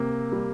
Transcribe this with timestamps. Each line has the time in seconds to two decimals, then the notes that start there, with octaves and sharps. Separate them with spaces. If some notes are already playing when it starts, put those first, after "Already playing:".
Already playing: C3 A#3
0.32 G3